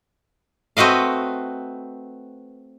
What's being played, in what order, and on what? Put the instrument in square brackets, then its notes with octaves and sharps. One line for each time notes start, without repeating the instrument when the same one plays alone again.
[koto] A3 C4 F#4 B4 D#5 F5